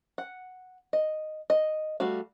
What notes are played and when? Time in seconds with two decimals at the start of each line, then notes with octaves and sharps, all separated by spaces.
0.18 F#5
0.93 D#5
1.50 D#5
2.00 G3 A3 F#4 F5